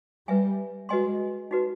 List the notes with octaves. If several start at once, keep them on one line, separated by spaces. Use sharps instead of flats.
G3 B4 E5 G#5
G#3 F#4 B4 D#5 G#5 C6
D#4 F#4 B4